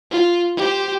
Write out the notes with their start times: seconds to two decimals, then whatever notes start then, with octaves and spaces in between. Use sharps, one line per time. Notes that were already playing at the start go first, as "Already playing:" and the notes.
0.11 F4
0.57 G4 C5